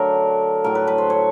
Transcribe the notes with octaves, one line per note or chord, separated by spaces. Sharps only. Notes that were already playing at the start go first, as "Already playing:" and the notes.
Already playing: D3 F#3 A3 A#4
A2 F#3 A3 A#4
B4
B4
C5
C#5